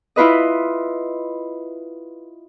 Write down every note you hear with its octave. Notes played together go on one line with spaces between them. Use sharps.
E4 F4 B4 D#5